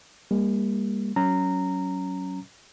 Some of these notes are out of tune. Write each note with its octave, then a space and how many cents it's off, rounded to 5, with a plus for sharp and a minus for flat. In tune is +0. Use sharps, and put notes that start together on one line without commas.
G3 +45 A#3 +10
F#3 +15 C#4 +0 A#5 -15